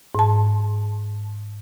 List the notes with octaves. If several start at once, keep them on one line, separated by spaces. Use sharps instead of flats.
G#2 A5